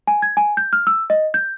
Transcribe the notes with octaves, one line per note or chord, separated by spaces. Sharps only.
G#5
G#6
G#5
G6
F6
E6
D#5
G6